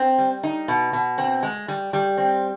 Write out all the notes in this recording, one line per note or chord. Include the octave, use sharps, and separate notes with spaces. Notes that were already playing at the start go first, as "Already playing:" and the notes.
Already playing: C4
G3
D#4
B2
B2
C4
G#3
G3
G3
C4